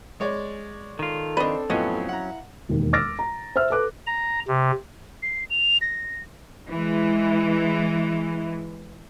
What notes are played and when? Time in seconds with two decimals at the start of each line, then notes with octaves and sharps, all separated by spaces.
0.20 G#3 C#5 D5
0.99 D#3 F4 A4
1.37 C4 D4 B4 D#5
1.70 F2 A2 F#3 B3 C#4 D#5 F5
2.09 E4 F#5 A#5
2.69 E1 D#2
2.93 D6 E6 F6 A6 A#6 D7
3.19 A#5
3.56 C5 E5 E6 F6
3.70 A4 B4 D6 F#6
4.07 A#5
4.48 C3
5.23 C7
5.50 F7
5.81 A#6
6.70 E3 G#3